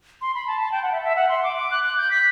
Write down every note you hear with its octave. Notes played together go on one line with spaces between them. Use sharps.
C6
B5
A5
A5
G5
F#5
E5
E5
F#5
C6
D6
D6
F#6
F#6
G6
B6